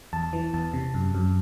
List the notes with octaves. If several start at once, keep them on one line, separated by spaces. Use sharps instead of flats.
E2 A5
E3
E2 A5
C3
F#2
F#2